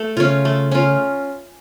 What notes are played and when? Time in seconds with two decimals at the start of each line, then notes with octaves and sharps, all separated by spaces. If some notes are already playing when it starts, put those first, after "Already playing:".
Already playing: A3
0.17 C#3 C#4 F4
0.45 A3
0.71 C#4 F4